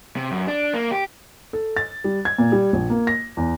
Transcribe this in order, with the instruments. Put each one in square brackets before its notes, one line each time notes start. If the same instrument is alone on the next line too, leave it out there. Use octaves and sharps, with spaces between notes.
[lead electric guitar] C3
F#2
D4
A#3
G4
[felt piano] A4
A6
G3
G#6
A#2
G3
A#1
A#3
A#6
E2